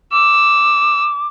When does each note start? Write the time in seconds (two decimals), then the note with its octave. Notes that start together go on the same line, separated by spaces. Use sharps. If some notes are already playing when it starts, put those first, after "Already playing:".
0.12 D6 E6